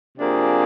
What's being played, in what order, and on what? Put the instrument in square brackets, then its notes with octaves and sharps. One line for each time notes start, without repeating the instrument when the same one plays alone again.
[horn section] C3 F3 A#3 D4 G#4